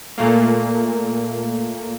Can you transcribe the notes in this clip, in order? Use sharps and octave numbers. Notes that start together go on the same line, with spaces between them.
A#2 A3 A#3